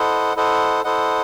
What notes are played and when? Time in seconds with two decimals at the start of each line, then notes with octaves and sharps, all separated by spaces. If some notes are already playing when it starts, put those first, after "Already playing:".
Already playing: E4 A4 C5 D#5 F#5
0.36 E4 A4 C5 D#5 F#5
0.84 E4 A4 C5 D#5 F#5